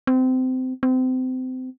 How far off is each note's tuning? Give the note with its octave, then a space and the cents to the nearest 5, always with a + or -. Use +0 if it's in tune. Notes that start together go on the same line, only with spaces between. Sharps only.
C4 -25
C4 -30